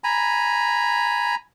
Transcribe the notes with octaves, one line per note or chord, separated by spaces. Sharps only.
G#5 A#5 B5